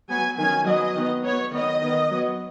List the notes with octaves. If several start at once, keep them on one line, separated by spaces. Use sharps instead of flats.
F#3 B3 G#5
D#3 F#3 C#4 G#5
F#3 B3 D#5
D#3 B3
F#3 B3 C#5
D#3 B3 D#5
D#3 B3
F#3 B3